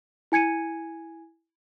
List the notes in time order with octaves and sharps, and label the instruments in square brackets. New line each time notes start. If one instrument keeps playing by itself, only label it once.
[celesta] E4 G#5 G#6 C#7 D#7